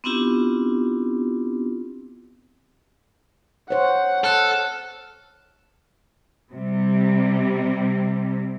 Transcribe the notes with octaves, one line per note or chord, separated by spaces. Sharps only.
B3 C4 D4 E4 F4 G4
C5 C#5 F#5
A4 F6 F#6
C3 G3